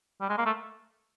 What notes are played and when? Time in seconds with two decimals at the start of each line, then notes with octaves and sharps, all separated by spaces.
0.21 G3
0.29 G#3
0.38 A#3
0.46 A3